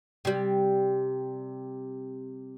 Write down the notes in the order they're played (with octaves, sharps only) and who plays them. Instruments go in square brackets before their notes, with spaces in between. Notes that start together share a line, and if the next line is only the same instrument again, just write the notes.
[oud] C3 G3